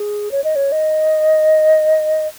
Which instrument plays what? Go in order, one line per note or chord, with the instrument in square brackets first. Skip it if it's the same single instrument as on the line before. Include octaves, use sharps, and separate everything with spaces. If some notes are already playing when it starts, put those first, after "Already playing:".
Already playing: [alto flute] G#4
C#5
D#5
C#5
D#5